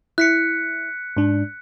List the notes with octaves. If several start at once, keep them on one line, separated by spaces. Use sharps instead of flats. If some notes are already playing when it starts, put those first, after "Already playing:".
E4 F#6 B6 C#7
G#2 D4